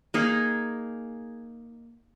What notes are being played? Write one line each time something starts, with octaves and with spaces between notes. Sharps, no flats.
A#3 D#4 G#4